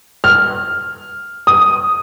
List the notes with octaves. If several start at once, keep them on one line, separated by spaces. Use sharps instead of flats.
F6
D#6